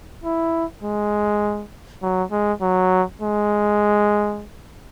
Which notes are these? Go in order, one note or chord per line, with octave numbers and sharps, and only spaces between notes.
E4
G#3
F#3
G#3
F#3
G#3